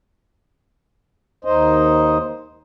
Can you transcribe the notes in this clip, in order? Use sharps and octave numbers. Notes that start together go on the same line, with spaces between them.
D#2 D#4 C5 D#5